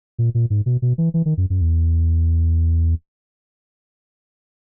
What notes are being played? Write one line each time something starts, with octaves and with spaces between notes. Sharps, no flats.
A#2
A#2
G#2
B2
B2
E3
E3
D#3
F#2
F#2
E2